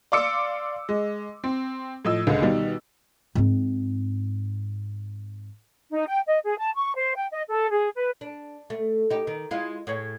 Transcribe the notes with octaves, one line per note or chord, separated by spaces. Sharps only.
D5 F5 C6 D6 E6 C#7
G#3
C4
A2 F3 D#5 E6
C#2 D3 G#3
B2 D#3 G3
G#2 C4
D#4
G5
D#5
G#4
A5
C#6
C5
G5
D#5
A4
G#4
B4
D4
A3
D#4 G4
D#3
G#3 E4 F4
A2 G#4 C#5